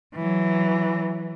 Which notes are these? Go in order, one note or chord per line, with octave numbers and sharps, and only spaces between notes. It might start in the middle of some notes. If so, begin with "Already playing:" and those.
E3 F#3